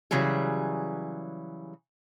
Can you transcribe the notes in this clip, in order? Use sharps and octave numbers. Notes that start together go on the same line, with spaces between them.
C#3 E3 F#3 G3 G#4